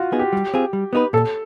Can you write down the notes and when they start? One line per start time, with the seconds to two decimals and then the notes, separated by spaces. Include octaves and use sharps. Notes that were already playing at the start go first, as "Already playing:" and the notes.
Already playing: F4 F#4
0.12 B3 D#4 G#4
0.19 G4
0.33 G3
0.54 C4 F4 G#4
0.73 G3
0.93 B3 D#4 F#4 B4
1.13 A#2 A4